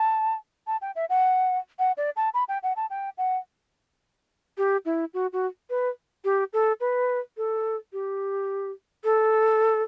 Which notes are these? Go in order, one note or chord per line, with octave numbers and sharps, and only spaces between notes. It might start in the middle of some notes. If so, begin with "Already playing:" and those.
Already playing: A5
A5
G5
E5
F#5
F#5
D5
A5
B5
G5
F#5
A5
G5
F#5
G4
E4
F#4
F#4
B4
G4
A4
B4
A4
G4
A4